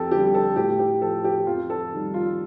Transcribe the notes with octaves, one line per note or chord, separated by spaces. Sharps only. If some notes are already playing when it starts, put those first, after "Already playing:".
Already playing: F2 G4 A4
D3 G3 G4
A4
A2 G4
G4
F3 A4
G4
F2 F4
A4
D#3 G3
F4